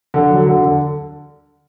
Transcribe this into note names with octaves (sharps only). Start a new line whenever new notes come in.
D3
F#3
D3
D3